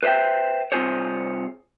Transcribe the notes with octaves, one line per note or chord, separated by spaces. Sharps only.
B4 C5 D5 E5 G5
C2 C4 F4 G#4 C5 C#5